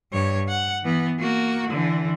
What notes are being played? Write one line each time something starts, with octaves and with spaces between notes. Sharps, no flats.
G2 C#5
F#5
E3 B3
A#3 F#4
D3 E3